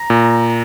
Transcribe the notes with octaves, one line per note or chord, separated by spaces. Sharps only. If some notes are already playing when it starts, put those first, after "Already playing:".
Already playing: A#5
A#2